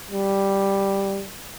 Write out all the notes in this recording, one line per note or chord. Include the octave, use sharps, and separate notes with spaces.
G3